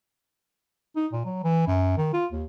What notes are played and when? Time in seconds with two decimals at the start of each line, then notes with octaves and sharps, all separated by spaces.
0.96 D#4
1.12 A#2
1.25 F#3
1.44 E3
1.67 F#2
1.97 D#3
2.13 F4
2.32 D#2